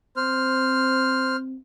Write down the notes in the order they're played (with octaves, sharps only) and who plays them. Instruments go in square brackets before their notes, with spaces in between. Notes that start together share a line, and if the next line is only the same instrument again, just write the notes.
[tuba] C4 [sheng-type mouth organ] C5 F6